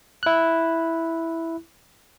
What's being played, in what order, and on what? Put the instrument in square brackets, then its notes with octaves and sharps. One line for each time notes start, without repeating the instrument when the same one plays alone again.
[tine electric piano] E4 F#6